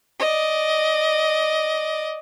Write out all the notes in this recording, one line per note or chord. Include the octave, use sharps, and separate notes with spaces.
D5 D#5